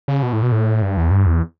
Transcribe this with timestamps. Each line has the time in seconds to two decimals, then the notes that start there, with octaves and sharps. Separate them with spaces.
0.08 C#3
0.23 B2
0.33 A2
0.42 B2
0.52 A2
0.82 G2
0.97 E2
1.11 G2
1.26 E2